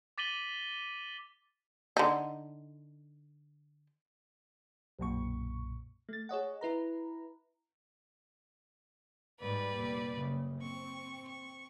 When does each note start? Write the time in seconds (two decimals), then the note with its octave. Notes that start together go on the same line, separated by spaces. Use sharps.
0.18 D6 A6 B6 D#7 F#7 G7
1.97 D3 D#4
4.99 B1 F#2 A#2 C#6
6.09 A3 A6
6.29 G#4 C#5 D#5 F#5
6.61 E4 B4 A#5
9.41 G#2 G3 B4 D5
9.75 F1 A#2
10.16 F#1 C#3
10.61 C4 C#6
11.29 C#6